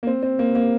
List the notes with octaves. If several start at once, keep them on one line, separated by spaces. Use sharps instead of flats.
A#3
C4
C4
A#3
A#3